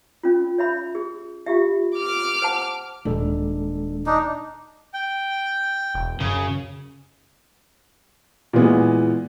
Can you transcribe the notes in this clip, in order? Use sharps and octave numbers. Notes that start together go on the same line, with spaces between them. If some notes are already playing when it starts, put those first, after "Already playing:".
C#4 F4
C#5 E5 B5
G#4
F4 G4 E5
D6 F6
C5 F#5 A5
D#1 G#3 D4 A4
D4 D#4
G5
E1
F#2 C#3
A#2 E3 G#3 B3